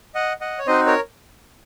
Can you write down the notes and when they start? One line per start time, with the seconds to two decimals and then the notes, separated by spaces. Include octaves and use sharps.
0.15 D#5 F#5
0.41 D#5 F#5
0.59 C#5
0.67 C4 D#4 F#4 C5 D#5
0.86 A#4 C#5